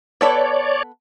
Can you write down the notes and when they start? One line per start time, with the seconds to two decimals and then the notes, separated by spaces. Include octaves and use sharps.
0.21 B3 A4 B4 C#5 D5